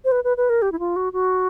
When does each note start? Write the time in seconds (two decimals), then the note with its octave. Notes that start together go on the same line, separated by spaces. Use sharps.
0.05 C5
0.12 B4
0.24 B4
0.37 B4
0.50 A#4
0.62 G4
0.72 E4
0.79 F4
0.96 F#4
1.13 F#4